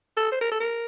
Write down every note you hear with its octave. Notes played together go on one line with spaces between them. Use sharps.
A4
C5
A#4
A4
A#4